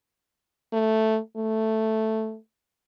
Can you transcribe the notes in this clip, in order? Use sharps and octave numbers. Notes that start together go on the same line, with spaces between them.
A3
A3